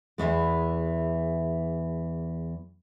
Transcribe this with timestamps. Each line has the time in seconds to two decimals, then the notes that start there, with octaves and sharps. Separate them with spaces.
0.18 E2 G2 E3 G#3